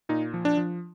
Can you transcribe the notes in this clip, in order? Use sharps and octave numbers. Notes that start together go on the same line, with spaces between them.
A#2 D#4
F3
D4
F3